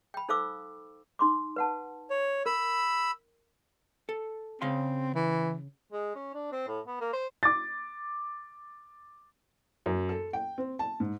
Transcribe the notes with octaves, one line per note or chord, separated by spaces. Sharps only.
G5 B5
D#4 A4 C5 F5 D6 E6
D#4 C6 D6
B4 F#5 A5
C#5
A#4 B5 E6
A4
C#3 C4 F5 C6
E3
G#3
C#4
D4
C4
A2
B3
A#3
C5
D6 A6
F#2
A4
G5
C4
A5
G#2